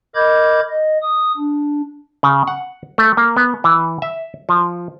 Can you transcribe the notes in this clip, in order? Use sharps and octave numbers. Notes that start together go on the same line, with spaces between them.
A#4 D#5 B5 D6 G6 G#6
D#5
D#6
D4
C#3
F#5
A3
A#3
B3
E3
E5
F3